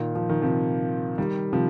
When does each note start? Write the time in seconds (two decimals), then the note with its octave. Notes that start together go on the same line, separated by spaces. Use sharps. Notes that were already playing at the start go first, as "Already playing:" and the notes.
Already playing: A#2 D#3
0.15 F3
0.29 D#3
0.42 C3 F3
1.18 D#3 G3
1.53 C3 F3